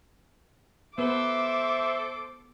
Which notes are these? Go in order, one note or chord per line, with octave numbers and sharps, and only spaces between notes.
B3 A4 B4 C5 E5 D6